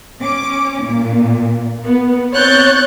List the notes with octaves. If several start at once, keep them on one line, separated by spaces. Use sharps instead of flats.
C#4 D6
A#2
B3
C4 C#5 F#6 G6 A6